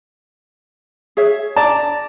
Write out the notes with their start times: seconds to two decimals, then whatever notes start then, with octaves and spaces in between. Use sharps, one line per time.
1.17 G#4 C#5 E5
1.56 D5 A5 A#5 D6